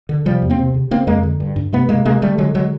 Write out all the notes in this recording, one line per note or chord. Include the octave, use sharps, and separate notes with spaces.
D3
C3 F3 G3
E2
A#3 C4
C3
C#3
C#3 A#3 C4
F2 G#3 A#3
D3
G2
G2
C3 A3 B3
C3 G#3 A#3
C3 G#3 A#3
D3 G3 A3
D3 F#3 G#3
D3 F#3 G#3